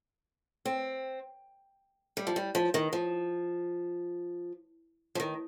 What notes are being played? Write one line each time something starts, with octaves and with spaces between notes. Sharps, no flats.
C4
G3
F3
G3
F3
D#3
F3
F3
D#3